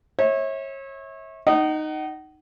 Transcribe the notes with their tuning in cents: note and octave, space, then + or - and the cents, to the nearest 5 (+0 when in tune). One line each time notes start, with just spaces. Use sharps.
C#5 -30 E5 -30
D#4 -10 F#5 +35 D#6 -10